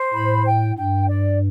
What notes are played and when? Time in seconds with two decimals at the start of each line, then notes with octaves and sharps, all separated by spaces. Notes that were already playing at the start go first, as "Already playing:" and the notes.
Already playing: C5
0.14 A2 B5
0.45 G5
0.77 G2 G5
1.09 D5